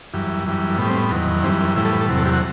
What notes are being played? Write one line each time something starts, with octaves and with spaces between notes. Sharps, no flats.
F#2 E3 G3
F#2 E3 G3
A2 G3 B3
C4
B3
E2 D#3 F#3
F#2 E3 G3 C4
A2 E3 G3 E4
A4
B4
A4
E2 C3 F#3
A4
G4
F#4